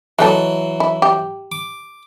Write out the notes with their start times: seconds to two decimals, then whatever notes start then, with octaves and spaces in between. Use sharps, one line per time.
0.19 E3 F#3 G#3 A3 A4
0.80 E4
1.02 G4
1.52 D6